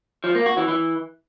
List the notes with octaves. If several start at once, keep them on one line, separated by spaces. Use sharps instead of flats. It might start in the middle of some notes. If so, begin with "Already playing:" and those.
F3
A#3
F#4
E3
E3